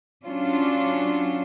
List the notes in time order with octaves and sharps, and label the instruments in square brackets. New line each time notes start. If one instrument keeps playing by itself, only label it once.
[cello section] F#3 C#4 D4 F4